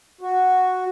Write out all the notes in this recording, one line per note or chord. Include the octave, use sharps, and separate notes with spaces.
F#4